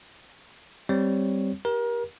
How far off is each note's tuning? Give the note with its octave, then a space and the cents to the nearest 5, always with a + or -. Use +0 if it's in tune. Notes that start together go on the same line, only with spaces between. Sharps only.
G3 +0 C4 +0 C#5 +0
G4 +0 A#4 +30